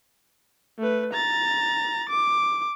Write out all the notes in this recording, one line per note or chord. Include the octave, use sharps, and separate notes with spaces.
A3 B4
A#5 A6
D6